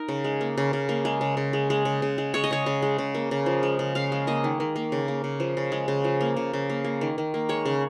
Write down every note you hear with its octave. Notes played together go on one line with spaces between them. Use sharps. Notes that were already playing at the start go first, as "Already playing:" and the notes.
Already playing: D#4 A#4
C#3
G#3
A#3
C#3
C#3
A#3
G#3
C#3
C#3
G#3
G#3
C#3
C#3
G#3
G#3 C#5
D#5
C#3 C#5
C#3
G#3
C#3
A#3
C#3
F3
G#3
C#3
C#3 F5
G#3
A#3 D#5
D#3
D#3
A#3
C#3
A#3
C#3
F3
C#3
G#3
C#3
F3
A#3
C#3
C#3
A#3
A#3
D#3
D#3
A#3
G#3 C#5
C#3